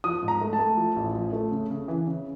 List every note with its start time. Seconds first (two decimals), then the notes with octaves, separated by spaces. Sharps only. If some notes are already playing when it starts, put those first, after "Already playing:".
0.04 F3 D#6
0.23 G#2
0.28 A#5
0.41 A3
0.53 A5
0.59 A3
0.77 F3
0.96 A1
1.15 F3
1.33 A3
1.51 C#3
1.70 C#3
1.88 E3
2.07 C#3